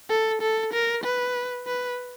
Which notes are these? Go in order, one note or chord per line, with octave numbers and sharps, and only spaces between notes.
A4
A4
A#4
B4
B4